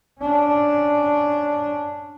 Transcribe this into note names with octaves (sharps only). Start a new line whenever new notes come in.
C#4 D4